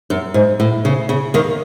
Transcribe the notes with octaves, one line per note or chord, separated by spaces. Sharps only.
F#2
G#2
A2
C#3
C#3
D#2 D#3